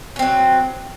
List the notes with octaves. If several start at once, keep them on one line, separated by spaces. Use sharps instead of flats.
F#3 C4 C#4